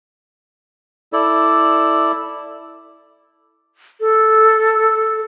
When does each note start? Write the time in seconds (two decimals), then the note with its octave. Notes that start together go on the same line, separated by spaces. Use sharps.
1.13 E4 A4 D5
4.00 A4